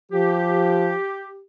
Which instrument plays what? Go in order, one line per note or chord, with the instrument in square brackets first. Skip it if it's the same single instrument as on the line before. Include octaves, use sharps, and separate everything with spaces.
[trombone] F3 [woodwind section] G4